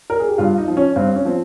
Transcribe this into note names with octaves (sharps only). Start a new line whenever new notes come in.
A#4
G#4
G4
G2 F4
D#4
F3
C#4
G2 C4
C#4
F3 C4